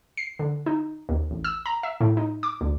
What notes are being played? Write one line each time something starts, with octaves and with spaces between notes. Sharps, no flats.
C7
D3
D#4
D#2
A1
E6
A#5
E5
A2
D#4
D6
D2